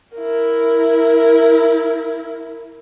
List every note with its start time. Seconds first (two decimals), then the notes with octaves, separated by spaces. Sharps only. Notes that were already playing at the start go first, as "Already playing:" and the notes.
0.17 E4 A#4